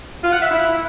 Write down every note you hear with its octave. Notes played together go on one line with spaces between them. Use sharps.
F4
F#5
E5
E4